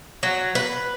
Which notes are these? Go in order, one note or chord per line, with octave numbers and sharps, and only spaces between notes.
F#3
B4